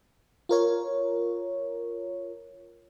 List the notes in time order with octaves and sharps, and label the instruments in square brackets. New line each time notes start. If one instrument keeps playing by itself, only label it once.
[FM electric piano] F4 A#4 C#5